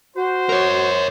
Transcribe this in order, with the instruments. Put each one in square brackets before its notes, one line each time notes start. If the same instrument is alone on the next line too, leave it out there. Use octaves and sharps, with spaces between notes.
[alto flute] F#4 [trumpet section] C5
[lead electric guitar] A#4 C#5